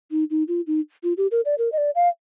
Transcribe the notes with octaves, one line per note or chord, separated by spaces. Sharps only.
D#4
D#4
F4
D#4
F4
G4
A#4
D5
A#4
D#5
D5
F5